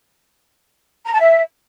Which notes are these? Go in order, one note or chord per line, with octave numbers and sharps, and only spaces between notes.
A#5
A5
E5